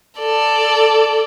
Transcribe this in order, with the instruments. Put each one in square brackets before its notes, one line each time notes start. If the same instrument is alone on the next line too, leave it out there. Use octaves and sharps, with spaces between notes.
[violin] A4 D5